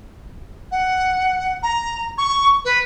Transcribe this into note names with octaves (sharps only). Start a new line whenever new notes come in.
F#5
A#5
C#6
B4